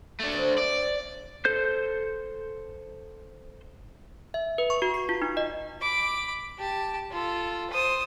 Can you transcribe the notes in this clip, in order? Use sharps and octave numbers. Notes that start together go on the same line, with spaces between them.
A3 D4
C4 C#4 B4
D5
A4 C5 G6
E5
B4
C#6
F#4
C7
F4
D#4
D#5
B5 D6
G4 A5
F4 A4
C5 D#6